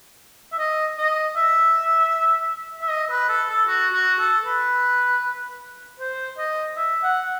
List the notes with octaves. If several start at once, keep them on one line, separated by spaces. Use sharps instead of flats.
E5
D#5
D#5
E5
E5
D#5
B4
A4
A4
F#4
F#4
A4
B4
C5
D#5
E5
F#5